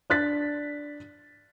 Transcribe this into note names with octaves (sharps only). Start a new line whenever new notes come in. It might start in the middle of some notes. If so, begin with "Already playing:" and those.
D4 F#6 A6 B6